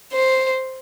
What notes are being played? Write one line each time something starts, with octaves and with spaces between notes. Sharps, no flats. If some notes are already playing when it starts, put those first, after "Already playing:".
C5